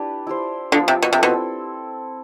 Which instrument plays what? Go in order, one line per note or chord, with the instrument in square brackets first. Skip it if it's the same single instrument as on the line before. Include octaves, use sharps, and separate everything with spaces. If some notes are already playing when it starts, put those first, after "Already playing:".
Already playing: [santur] D4 E4 G4 B4
E4 G4 C5
[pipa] D3 [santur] F3 B3 F4
[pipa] C3
B2
C3
[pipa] B2 [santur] C4 E4 A4